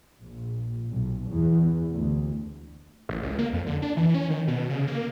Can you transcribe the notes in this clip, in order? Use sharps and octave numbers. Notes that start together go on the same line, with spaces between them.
A#1
B1
E2
D2
A1
C#2
A#3
F2
D3
D4
E3
C#4
D#3
B2
C#3
A#3